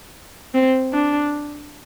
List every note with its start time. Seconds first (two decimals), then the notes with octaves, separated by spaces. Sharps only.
0.54 C4
0.93 D4